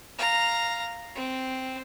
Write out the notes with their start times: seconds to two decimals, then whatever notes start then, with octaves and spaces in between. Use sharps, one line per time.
0.18 F5 A#5
1.15 C4